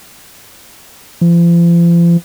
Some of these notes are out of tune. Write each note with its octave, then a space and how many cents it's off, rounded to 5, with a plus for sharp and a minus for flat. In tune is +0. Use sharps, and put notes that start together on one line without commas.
F3 -40